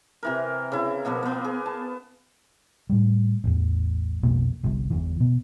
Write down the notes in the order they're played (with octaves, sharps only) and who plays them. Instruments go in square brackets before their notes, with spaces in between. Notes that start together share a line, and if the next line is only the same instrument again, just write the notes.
[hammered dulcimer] C3 E3 A#4
C#3 E4
B2 F3 A#3 B3
A#3 B3
G#4
A5
[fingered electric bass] A2 G3
A1 E2
B1 F2 B2 A#3
G1 C2
G1 E2 E3
B2 B3